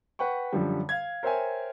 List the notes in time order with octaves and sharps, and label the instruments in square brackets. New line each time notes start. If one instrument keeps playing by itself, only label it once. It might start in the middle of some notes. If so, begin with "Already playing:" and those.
[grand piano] B4 F#5 G5 C#6
F#2 D3 F3 G3
F5 G#6
A#4 C5 C#5 E5 G5 G#5